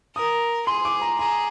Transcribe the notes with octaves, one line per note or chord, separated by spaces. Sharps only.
A#4 D#6
G#4 C6
D6
A#5
G#4 A#5